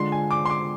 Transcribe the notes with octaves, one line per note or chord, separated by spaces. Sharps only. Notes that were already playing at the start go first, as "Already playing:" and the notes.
Already playing: D3 G#3 D4 F4 C6
G#5
D6
C6
D6